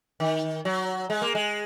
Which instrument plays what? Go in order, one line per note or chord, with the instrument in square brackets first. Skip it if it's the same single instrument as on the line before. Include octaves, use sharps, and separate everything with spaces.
[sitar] D#3
F#3
G#3
A#3
G#3